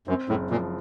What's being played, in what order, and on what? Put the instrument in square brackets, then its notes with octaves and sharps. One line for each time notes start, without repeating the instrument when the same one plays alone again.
[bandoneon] F#2 [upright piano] C4
[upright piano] F#1 [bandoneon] A2
[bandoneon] A#2 [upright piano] F3